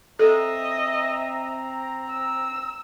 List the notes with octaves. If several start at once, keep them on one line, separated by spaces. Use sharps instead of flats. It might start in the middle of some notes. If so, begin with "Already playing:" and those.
C4 A4 D#5 E5 A#5
E6